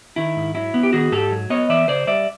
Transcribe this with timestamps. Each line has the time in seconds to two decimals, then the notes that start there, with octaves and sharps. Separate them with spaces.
0.16 D#3 E4
0.36 G#2
0.55 F#3 E4
0.74 B3
0.83 G4
0.93 D#3 F#4 G#4
1.12 G#2 G4 A4
1.31 F#3
1.50 B3 C#5 D#5
1.69 E3 D5 E5
1.88 C#3 C5 D5
2.07 G3 D5 E5